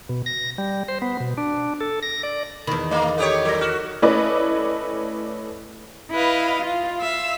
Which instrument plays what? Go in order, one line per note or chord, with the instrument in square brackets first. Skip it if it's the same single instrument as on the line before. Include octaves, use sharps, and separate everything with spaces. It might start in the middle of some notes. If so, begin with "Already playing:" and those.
[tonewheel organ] B2
A#6
G3
C5
B3
B2
D4
A4
A#6
D5
[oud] E2 D#3 [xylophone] B5
[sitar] A3 A#3 [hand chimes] D#5
[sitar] B3 G4 C#5 [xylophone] A4 D#6
[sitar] F#3 [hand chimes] A#4 [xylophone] D6 G#6 A#6
[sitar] F#4 [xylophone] F6
[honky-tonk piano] A3 C#4 E4 B4 D5 D#5
[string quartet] E4 B4 D#5 F5
F4
E5 F5 E6